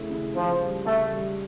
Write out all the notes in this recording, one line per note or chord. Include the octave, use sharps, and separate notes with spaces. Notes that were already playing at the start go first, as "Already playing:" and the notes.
Already playing: C#3 A3 E4
C#3
C#3 F3
G3
C#3 A3
G3